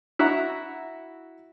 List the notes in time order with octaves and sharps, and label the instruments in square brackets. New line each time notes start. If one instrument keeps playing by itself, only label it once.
[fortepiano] E4 F#4 F#5 A#5